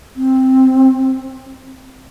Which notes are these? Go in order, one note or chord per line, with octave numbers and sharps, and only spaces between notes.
C4